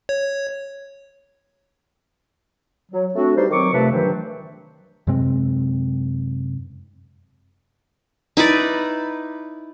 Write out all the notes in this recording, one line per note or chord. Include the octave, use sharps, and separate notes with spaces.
C#5
F#3
A3 C4 D4 F#4
G3 D#4 B4 C5
D#3 F#3 C4 C#6 D6
F2 C3 A3 B4 E5 A5
G2 D#3 E3 F#3 C5
F#2 C3 G#3 C4
D#4 E4 B4 D5